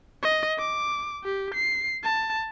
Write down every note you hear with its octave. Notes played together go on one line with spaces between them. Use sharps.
D#5
D6
G4
C7
A5